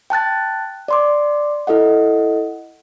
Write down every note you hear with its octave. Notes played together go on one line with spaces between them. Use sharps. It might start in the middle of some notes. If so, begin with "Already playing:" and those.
G5 A5 F#6 A6
D5 C6 D6
E4 A4 D#5 F#5